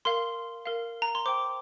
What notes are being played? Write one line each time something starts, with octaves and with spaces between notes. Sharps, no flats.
A#4 F5 C6
A#4 F5
A#5
C6
C5 G5 D6